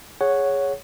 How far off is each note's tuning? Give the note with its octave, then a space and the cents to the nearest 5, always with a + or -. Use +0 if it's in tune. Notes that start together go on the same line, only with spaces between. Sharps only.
G#4 +0 C#5 +0 F#5 +0